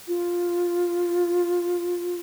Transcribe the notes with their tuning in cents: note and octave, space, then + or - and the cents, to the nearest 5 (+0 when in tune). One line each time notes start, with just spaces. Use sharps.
F4 +5